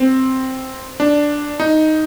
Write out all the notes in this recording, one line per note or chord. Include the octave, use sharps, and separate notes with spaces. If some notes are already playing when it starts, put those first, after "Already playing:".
Already playing: C4
D4
D#4